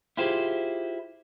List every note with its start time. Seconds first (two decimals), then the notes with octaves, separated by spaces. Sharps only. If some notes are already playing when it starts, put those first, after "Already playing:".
0.17 E4 F4 G4 G#4 C5